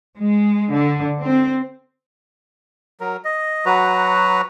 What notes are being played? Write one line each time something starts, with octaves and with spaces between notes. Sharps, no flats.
G#3
D3
C4
F#3 A#4
D#5
F#3 F#4 B4 A#5